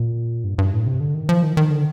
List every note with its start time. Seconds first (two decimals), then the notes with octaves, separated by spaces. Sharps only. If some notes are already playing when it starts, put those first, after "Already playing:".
Already playing: A#2
0.44 G2
0.58 G2
0.73 A2
0.86 C3
1.00 D3
1.14 D#3
1.29 F3
1.43 D#3
1.57 D#3
1.70 D3